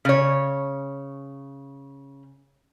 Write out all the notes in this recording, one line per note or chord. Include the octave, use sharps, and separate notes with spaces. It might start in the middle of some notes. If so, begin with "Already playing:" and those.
C#3 C#5